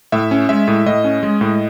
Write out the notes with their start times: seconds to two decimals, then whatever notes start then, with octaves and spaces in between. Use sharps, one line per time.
0.12 A2 E5
0.31 C#4
0.49 G#3 E5
0.68 A2
0.86 A2 D#5
1.04 C#4
1.23 G#3
1.41 A2